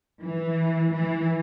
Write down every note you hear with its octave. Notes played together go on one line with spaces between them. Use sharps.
E3
E3